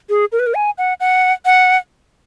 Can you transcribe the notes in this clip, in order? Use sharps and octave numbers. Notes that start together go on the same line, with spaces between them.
G#4
A#4
B4
A#4
G#5
F#5
F#5
F#5